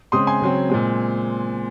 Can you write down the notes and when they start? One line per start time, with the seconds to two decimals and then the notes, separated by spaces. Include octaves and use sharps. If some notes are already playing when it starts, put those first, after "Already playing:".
0.12 C#3 G#3 C4 C6 D#6
0.27 G#5 C6
0.41 C#3 F#3 C4
0.70 A#2 G#3 C4